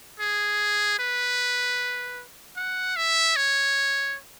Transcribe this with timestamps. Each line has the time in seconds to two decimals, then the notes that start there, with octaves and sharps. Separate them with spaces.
0.20 G#4
0.99 B4
2.57 F#5
2.96 E5
3.36 C#5